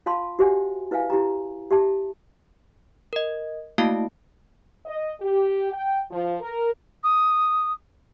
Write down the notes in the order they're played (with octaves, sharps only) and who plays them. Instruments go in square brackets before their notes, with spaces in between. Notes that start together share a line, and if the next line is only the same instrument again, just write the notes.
[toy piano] F4 F5 A5 C6
F#4 G4 C5 E5 F#5 G#5
E4 B4 E5 F5 G#5
E4 G4 A#5
G4 E5 A5
[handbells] A#4 D#5
A3 A#3 E4 F#4 F5 A5
[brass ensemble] D#5
G4
G5
F3
A#4
[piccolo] D#6